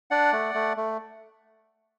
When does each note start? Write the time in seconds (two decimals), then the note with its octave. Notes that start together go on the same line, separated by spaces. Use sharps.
0.11 D4 D5 F#5
0.33 A3
0.55 A3
0.77 A3